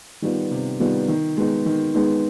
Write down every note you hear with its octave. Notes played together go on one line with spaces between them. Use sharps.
D#3 G3 B3 F4
C3
D#3 G3 B3 F4
D#3
G#3 B3 D#4
D#3
G#3 B3 D#4